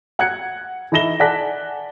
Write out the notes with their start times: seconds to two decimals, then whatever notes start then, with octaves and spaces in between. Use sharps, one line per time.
0.19 F#5 F#6 G#6 C#7
0.92 E3 D#4 E4 A#6 E7 G7
1.20 D5 F#5 G#5 A5 F#6 B6